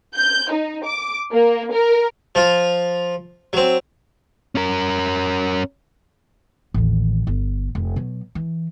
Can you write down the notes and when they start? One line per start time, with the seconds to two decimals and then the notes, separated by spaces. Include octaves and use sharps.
0.14 G6
0.51 D#4
0.85 D6
1.32 A#3
1.72 A#4
2.35 F3 F4
3.53 F#3 C4
4.55 C#4 A#4
6.74 A1 D#2
7.27 G1
7.75 F1
7.96 B2 F#3
8.35 E3